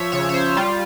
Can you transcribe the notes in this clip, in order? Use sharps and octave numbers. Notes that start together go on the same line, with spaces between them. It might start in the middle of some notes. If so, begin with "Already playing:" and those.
Already playing: F3 C#5 E5
C#3 C#5
C#5
C5
G3 F4